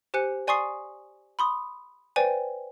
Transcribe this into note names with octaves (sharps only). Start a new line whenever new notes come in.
G4 C5 G#5 F#6 C#7
D5 G#5 C6 C#6 D#6 C7
B5 C6 D#6
B4 C5 D5 G5 G#5